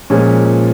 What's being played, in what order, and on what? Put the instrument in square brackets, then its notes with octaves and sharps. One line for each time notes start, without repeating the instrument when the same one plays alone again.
[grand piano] A#2 F3 G#3 C#4